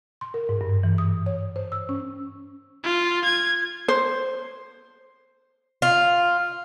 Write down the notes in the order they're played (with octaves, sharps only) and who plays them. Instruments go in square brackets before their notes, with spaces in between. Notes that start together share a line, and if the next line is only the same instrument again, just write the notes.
[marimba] C6
A#4
G#2
G2
E3
D#6
C#5
C5
E6
C#4
[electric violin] F4
G#6
[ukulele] C5
[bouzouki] F4